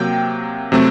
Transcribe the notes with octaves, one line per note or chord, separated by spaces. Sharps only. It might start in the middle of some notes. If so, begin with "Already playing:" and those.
Already playing: C3 F#3 A#3 G5
C3 F#3 A3 C4